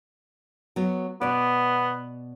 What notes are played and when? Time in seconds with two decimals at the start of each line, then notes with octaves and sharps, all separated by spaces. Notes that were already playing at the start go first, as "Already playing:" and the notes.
0.76 F#3 B3
1.21 B2 B3 D5